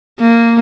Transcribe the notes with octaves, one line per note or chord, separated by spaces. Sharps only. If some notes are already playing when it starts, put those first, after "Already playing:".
A#3